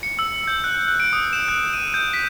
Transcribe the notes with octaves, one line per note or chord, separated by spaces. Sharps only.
C#7
E6
G6
F#6
F#6
D7
D#6
E7
F#6
D#7
G6
B6